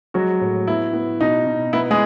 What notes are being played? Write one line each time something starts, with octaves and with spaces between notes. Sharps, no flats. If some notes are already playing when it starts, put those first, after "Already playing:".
F#3 G#3 F#4
A2
B3 E4
B3
B2 D#4
B2
B3 E4
G#3 G#4